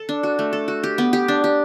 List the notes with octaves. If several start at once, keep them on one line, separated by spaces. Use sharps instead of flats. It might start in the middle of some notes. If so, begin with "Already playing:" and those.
Already playing: A4
D4
F#4
A3
A4
F#4
G4
B3
G4
D4
G4